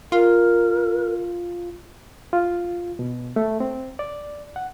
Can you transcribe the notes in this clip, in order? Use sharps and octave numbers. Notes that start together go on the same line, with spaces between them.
F4 A#4
F4
B2
A3
C4
D5
F#5